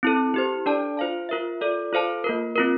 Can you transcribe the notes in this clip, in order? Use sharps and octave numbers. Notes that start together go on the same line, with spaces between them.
C4 E4 A4
E4 G4 C5
D4 A4 D5 A5
F4 C5 F5 A5
F4 A#4 E5
F4 A4 D5
F4 A4 C5 F5 A5
A#3 F4 A#4
C4 F4 A#4